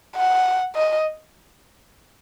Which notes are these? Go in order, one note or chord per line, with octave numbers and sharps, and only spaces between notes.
F#5
D#5